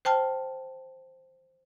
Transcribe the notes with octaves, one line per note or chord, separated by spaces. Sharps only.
C5 G5 A5 F6